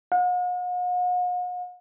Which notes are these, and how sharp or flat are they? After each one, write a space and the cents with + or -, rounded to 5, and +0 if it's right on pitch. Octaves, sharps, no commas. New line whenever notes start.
F#5 -45